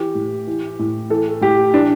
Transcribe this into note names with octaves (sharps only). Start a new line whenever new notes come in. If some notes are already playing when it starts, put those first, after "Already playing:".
Already playing: E3 G4
A2
E3
A2
E3 A4
A2 G4
E3 D4